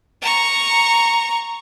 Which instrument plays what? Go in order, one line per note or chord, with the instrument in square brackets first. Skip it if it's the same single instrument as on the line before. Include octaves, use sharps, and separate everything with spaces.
[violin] A#5 C#6